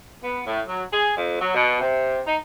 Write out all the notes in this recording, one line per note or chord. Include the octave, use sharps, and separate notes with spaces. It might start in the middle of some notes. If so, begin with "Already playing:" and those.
B3
A2
F#3
G#4
F2
F#3
B2
C3
D#4